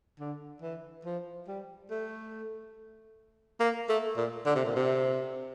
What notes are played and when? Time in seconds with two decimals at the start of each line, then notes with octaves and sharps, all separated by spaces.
0.20 D3
0.63 E3
1.05 F3
1.48 G3
1.91 A3
3.60 A#3
3.89 A3
4.17 A#2
4.46 D3
4.55 C3
4.65 A#2
4.76 C3